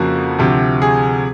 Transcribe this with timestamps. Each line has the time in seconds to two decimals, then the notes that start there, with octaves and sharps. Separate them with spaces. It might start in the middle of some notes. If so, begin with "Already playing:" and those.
Already playing: F2 C#3 F3 A#3 F#4
0.39 D2 C3 F3
0.82 G#4